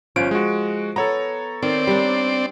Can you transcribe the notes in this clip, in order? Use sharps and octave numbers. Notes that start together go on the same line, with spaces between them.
G1 F3 C#4 D7
G#3 F#4
B3 A4 C#5 A#5
D#3 C4 D5
G3 D4